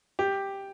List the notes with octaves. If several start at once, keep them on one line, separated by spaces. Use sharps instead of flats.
G4